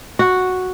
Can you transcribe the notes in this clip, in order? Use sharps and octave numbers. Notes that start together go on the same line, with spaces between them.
F#4